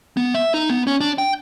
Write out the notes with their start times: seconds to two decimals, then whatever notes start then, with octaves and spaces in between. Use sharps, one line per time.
0.17 B3
0.34 E5
0.54 D#4
0.70 B3
0.87 C#4
1.01 D4
1.18 G5